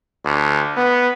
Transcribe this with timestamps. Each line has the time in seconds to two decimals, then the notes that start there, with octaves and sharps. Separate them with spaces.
0.25 D2
0.77 B3